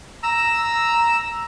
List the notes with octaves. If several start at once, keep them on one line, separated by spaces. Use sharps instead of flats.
A#5 E6